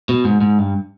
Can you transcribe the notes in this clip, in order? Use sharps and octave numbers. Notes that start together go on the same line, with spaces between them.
B2
G#2
G#2
G2